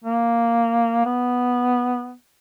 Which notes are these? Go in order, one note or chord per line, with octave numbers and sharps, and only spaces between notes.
A#3
B3